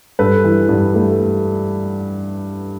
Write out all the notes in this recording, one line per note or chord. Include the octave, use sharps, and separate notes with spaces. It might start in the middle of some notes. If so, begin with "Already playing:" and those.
G2 A4 B4
E3
G2
A3